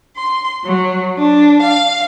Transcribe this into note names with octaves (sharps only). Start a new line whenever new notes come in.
C6
F#3
D4
F5